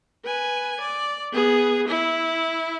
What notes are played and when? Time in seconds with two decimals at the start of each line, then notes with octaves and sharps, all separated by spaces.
0.25 B4 G#5
0.81 D5
1.32 B3 G#4
1.88 E4